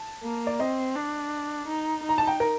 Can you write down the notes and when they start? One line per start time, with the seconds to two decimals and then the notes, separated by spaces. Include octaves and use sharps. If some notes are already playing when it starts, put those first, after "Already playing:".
Already playing: A5
0.23 A#3
0.47 D5
0.59 C4 D#5
0.96 D4
1.68 D#4
2.03 D#4
2.09 A#5
2.18 A5
2.27 G5
2.40 A#4